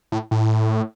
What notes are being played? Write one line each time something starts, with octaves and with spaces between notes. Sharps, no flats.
A2
A2